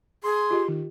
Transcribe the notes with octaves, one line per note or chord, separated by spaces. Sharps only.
G#4 C6
F4 G4 D#5
D#3